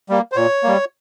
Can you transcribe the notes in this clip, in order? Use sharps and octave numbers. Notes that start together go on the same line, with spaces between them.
G3 A#3
C5
A#2 C#5
G3 A#3